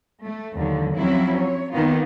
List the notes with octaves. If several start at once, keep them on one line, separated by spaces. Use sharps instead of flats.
A3
D#2 D3 F#3
F3 F#3 C4 C#4 E4
C#5
D#3 A#3 B3 D#4 F4